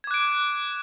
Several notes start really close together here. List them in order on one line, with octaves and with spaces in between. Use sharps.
G#6 D6 F#6 D7